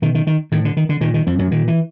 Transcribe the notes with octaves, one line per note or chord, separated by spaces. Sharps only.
B2 D#3
D#3
D#3
A2 D#3
D3
D#3
D3
A#2 D#3
D#3
F2 F3
F#2 F#3
A#2 D#3
E3